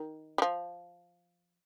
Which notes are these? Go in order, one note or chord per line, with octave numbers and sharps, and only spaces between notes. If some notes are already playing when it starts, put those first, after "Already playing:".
Already playing: D#3
G3
F3